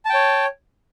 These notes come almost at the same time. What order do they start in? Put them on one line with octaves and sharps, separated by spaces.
A5 G5 C#5